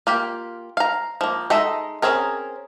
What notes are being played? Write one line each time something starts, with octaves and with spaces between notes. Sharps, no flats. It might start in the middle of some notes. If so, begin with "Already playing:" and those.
A#3 F4 G4
F5 A#5
F3 A#3
G#3 D#4 A4 E5
C4 C#4 G#4 A#4